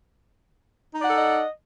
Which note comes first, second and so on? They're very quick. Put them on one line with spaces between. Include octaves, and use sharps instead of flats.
D#4 D5 F#5 A4 D#5